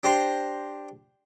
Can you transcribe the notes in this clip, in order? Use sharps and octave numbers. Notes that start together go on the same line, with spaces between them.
D4 G4 C5 A#5 C6